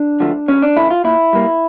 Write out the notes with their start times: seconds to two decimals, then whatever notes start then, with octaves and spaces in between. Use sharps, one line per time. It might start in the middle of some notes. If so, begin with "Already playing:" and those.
Already playing: D4
0.20 D3 F3 A3
0.48 E2 C#4
0.62 D4
0.76 C#3 E3 A3 E4
0.90 F4
1.04 A#2 E4
1.33 G3 A#3